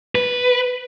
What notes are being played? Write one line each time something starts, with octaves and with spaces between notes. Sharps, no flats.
B4